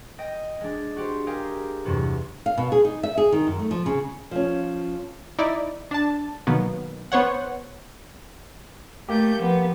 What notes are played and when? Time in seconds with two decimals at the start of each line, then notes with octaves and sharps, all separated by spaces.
0.18 D#5 G5 A#6
0.61 G#3 D4
0.96 F#4 G4 C5
1.27 G4 G#4 A#4 F5 G5 A#5
1.85 E2 G2 C3 F#3 B3
2.46 F5
2.58 B2
2.72 G#4
2.85 D#4
3.03 E5
3.17 G#4
3.32 D#3
3.47 F#2
3.59 A3
3.71 F3
3.86 C#3
4.31 F3 C#4
5.39 D#4 E4 D5
5.91 D4 A5
6.47 B2 D#3 F#3 A#3 B3
7.12 B3 C5 C#5 F#5
9.09 A3 A#3 G4 G6
9.40 F3 B3